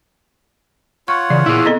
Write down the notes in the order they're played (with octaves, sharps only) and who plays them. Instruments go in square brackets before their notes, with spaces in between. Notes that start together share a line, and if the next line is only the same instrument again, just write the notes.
[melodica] F4 C#5 F#5 [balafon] C#6
[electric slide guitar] C#3 [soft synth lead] E3 [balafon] D5
[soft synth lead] A#2 [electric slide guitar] E4 G#4
[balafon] B3 C4 A4 [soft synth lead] D#5